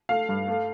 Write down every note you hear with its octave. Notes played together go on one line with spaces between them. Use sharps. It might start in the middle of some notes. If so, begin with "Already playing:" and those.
A3 F5
G2
A3